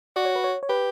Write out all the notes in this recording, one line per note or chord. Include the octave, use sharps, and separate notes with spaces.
F#4 D5
C#5
B4
C#5
C#5
G4 B4